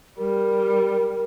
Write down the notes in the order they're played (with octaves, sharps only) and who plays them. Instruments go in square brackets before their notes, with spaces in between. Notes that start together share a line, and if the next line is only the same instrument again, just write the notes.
[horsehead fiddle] G3 [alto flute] A#4